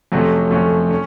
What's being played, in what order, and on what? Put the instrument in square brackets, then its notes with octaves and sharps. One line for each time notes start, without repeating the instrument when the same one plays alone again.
[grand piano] F2 C3 F#3 A3 C#4
F2 C3 F#3 A3 C#4
C#4